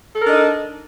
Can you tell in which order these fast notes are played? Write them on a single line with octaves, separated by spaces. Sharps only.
A4 A#4 D4 D#5 D#4